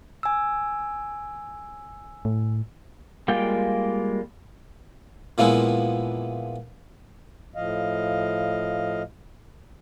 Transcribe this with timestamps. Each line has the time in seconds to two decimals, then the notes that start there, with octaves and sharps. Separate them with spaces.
0.23 G#5 E6
2.25 A2
3.28 G3 G#3 A#3 F4 G5
5.38 A#2 E3 F3 G#3 B3 E4
7.54 A2 F3 D#5 F5